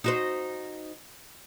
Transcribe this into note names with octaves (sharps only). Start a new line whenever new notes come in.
D#4 F#4 C5